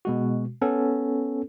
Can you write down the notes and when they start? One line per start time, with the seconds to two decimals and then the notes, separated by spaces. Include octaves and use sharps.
0.05 B2 G#3 F#4
0.62 B3 C#4 A4